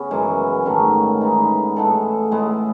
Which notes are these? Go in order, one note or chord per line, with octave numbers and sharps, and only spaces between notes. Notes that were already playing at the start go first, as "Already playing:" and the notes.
Already playing: C#3 B3 C#4
F#2 E3 G#3
G#2 D#3 A3 C#4
G#2 E3 B3 D#4
A2 G#3 B3 A4
A2 G#3 B3